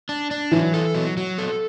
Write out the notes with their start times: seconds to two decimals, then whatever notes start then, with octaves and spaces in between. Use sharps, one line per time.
0.09 D4
0.31 D4
0.52 E3 F#3
0.74 A4
0.95 F#3
1.17 F#3
1.38 A4